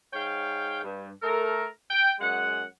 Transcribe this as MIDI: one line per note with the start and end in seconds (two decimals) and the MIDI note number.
0.13 0.80 44
0.13 0.80 73
0.13 0.80 77
0.13 0.80 79
0.83 1.10 43
1.22 1.65 57
1.22 1.65 69
1.22 1.65 70
1.90 2.13 79
2.20 2.64 42
2.20 2.64 56
2.20 2.64 78